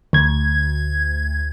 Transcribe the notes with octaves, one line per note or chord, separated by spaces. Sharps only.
D2 G#6